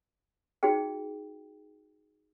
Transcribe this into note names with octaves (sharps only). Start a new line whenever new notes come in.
D#4 F#4 G#4 G5